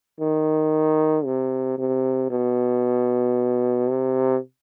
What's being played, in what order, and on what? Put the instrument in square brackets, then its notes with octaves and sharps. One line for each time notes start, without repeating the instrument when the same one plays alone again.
[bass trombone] D#3
C3
C3
B2
C3